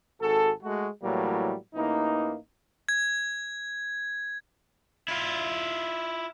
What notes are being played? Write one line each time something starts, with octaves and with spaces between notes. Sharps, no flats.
G#1 F#4 G#4 A4
G#3 A3 F#4
A2 E3 F#3 G3 A#3
A1 E3 A#3 D#4
G#6
E4 F4